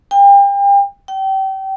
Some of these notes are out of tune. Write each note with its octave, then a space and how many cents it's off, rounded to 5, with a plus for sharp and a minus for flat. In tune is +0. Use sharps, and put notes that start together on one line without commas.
G5 +35
G5 -30